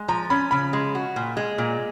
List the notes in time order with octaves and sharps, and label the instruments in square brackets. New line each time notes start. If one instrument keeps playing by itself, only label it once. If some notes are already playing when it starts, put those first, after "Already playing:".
Already playing: [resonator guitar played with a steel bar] G#3
[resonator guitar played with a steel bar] F3 [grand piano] A#5
[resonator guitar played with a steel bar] C#4 [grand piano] B5
[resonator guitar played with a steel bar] C#3 [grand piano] B5
[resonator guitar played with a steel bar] G#3
F#4
A#2
G#3
A#2